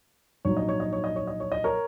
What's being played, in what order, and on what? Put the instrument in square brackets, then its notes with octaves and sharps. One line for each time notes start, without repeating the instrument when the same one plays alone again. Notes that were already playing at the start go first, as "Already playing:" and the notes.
[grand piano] A#1 G#2 F#3 C#5
D#5
C#5
D#5
C#5
D#5
C#5
D#5
C#5
D#5
A#4 C#5